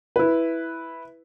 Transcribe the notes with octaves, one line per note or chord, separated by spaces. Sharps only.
E4 B4